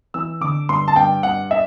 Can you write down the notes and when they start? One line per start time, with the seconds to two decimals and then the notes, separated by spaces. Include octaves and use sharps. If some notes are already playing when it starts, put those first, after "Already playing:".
0.14 E3 E6
0.41 D3 D6
0.69 G2 C6
0.88 A5
0.96 G2 G5
1.23 G2 F#5
1.51 E5